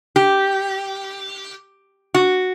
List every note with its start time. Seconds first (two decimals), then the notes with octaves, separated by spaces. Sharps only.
0.16 G4
2.14 F#4